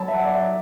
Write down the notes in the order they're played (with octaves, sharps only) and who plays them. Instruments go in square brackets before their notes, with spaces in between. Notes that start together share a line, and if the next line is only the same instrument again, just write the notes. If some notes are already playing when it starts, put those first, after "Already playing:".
Already playing: [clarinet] F#3 [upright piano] A5 B5
[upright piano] E5
F#5
D5
E5